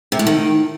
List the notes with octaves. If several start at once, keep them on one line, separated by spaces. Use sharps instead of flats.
C3
A2
D#3